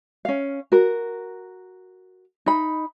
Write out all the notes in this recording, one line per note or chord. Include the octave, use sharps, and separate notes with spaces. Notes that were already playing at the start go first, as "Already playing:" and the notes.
C#4 F5
F#4 A#4
D#4 B5